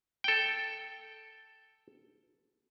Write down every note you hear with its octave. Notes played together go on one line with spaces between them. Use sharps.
A4 G5